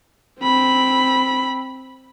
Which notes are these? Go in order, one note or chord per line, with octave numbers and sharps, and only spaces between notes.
C4 B5